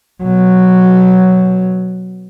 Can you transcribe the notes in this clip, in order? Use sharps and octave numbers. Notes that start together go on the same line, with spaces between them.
B2 F#3